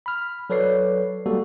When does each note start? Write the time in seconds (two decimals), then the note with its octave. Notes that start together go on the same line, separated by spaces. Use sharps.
0.06 B5 F6
0.50 F#3 A4 B4 C#5 D5 C7
1.26 G3 G#3 A#3 F#4 A4